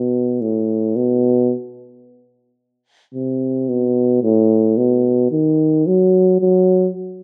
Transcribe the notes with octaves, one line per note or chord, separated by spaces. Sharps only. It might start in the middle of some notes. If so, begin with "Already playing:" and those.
Already playing: B2
A2
B2
C3
B2
A2
B2
D#3
F#3
F#3